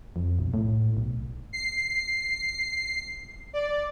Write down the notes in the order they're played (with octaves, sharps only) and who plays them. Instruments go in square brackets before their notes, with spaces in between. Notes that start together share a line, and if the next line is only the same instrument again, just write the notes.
[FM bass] F2
B1
A2
B1
[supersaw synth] C7
D5